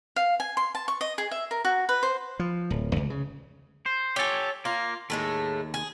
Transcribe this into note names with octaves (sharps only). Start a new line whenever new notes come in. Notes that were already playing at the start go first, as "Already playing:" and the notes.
F5
G#5
C6
A5
C#6
D#5
G#4
E5
A#4
F#4
B4
C5
F3
D1
C#2
C#3
C5
G4 A4 C#5 G#5
A#3 F4
D#2 A2 G#3 A3
G#4